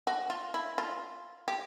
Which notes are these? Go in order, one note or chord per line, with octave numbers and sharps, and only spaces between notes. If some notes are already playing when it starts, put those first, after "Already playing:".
F#4
F4
E4
F4
G4